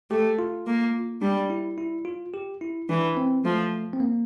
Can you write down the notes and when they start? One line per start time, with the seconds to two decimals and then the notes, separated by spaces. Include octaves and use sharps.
0.11 A3 G4
0.39 F4
0.67 A#3
1.22 G3 D4
1.50 E4
1.78 E4
2.05 F4
2.34 G4
2.61 E4
2.89 E3 D4
3.17 C4
3.44 F3 A3
3.93 C4
4.00 A#3